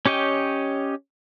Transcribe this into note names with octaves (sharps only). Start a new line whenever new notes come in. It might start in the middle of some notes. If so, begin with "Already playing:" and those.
C#4 G4 C#5 D#5 G5